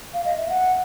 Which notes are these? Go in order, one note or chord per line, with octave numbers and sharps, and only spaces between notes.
F5
D#5
E5
F#5